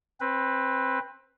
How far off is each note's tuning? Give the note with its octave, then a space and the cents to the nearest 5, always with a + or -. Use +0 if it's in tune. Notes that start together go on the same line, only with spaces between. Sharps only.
C4 +20 B4 +0